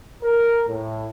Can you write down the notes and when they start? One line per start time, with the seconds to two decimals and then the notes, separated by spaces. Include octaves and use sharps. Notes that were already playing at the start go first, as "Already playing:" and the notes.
0.24 A#4
0.68 A2